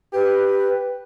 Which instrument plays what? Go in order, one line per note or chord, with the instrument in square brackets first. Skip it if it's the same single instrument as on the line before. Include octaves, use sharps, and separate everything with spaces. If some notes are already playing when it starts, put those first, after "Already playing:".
[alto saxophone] G4 [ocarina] B4